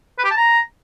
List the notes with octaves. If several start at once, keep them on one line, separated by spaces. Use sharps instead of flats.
B4
G4
A5
A#5